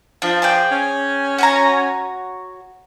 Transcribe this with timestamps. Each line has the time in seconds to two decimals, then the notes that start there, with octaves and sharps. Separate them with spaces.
0.22 F3 D4
0.42 G#4 D5 G5
0.71 C#4
1.38 F#4 C#5 A#5